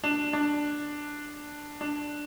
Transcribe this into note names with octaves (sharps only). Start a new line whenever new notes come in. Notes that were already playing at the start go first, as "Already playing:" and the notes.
D4
D4
D4